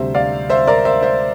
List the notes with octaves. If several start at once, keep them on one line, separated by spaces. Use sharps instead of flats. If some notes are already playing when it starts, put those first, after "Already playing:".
Already playing: D2 C3 G3 C5 E5
D5 F5
C5 E5
A#4 D5
C5 E5
C5 E5